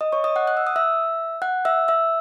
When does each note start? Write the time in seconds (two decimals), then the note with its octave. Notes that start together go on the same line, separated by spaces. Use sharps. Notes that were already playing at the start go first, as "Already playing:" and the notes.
0.01 D#5 D#6
0.12 C#5 C#6
0.24 D#5 D#6
0.36 F#5 F#6
0.47 F#6
0.57 E6
0.67 D#6
0.76 E5 E6
1.42 F#5 F#6
1.65 E5 E6
1.88 E5 E6